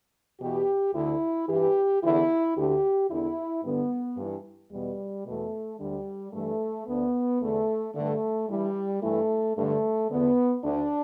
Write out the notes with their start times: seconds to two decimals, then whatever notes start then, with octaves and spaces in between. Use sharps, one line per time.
0.41 E2 B2 G4
0.94 D2 D3 E4
1.49 G2 E3 G4
2.02 E2 D3 E4
2.56 D2 D3 G4
3.10 E2 D3 E4
3.64 G2 D3 B3
4.17 G2 E3
4.71 E2 B2 G3
5.26 E2 B2 A3
5.79 D2 D3 G3
6.33 G2 E3 A3
6.87 D2 D3 B3
7.41 E2 D3 A3
7.94 G2 D3 A3
8.49 G2 E3 G3
9.03 G2 E3 A3
9.56 G2 D3 A3
10.10 E2 D3 B3
10.64 D2 D3 D4